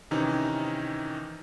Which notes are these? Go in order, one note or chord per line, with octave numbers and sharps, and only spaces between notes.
C3 D#3 E3 C#4 D#4